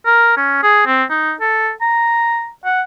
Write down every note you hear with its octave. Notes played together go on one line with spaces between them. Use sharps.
A#4
C#4
G#4
C4
D#4
A4
A#5
F#5